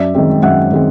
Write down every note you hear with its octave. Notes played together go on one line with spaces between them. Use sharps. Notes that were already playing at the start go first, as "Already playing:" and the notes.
Already playing: F#2 D5 E5
D#3 G#3 C4
F#2 E5 F#5
D#3 G#3 C4